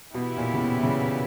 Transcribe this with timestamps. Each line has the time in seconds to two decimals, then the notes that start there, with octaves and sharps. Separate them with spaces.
0.14 B2 E3 B3 E4 G4
0.37 A#2
0.54 C#3
0.60 B2
0.83 C#3
1.06 B2